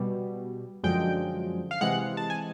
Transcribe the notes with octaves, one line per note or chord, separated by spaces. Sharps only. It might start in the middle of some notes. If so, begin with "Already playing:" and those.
Already playing: B2 G3
F#2 D3 F3 G#3 G5
F5
C3 E3 G#3 F#5
A5
G#5